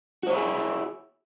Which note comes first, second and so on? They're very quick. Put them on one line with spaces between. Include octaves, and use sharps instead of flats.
F#4 C5 C#5 E4 G#4